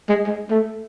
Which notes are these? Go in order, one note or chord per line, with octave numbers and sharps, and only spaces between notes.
G#3
G#3
A3